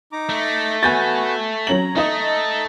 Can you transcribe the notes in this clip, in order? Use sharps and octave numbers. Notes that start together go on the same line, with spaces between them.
D#4 A#5 D6
A3
B3 F#4 G#5 G6 A6
F#3 C#4 A#5 F#7
A3 D#4 D#5